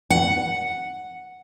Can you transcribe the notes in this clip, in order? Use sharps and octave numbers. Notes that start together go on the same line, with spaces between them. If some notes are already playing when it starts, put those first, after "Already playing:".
F#5